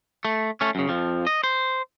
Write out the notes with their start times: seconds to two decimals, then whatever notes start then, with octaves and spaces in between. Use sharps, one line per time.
0.25 A3
0.61 A3 C#4
0.75 F#2 C#3
0.89 F2 F3
1.27 D#5
1.44 C5